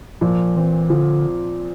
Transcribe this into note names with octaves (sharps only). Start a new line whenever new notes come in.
A#2 F3
E3 C4
D3 F3